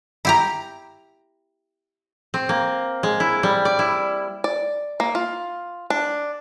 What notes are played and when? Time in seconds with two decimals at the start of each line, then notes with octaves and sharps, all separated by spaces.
0.25 E4 G4 A#5
2.34 C4
2.49 A#3
3.03 G#3
3.20 E4
3.43 G3
3.65 D5
3.79 E4
4.44 D5
5.00 A#3
5.15 F4
5.90 D4